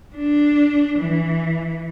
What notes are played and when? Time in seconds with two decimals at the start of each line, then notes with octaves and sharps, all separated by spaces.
0.16 D4
0.99 E3